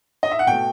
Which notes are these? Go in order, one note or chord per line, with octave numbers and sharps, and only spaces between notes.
D#5
E5
F#5
B2 A3 G5